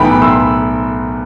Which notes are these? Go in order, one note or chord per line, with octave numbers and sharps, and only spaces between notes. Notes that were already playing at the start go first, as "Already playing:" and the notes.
Already playing: B1 A2 E3 B3 G5 B5
C6 E6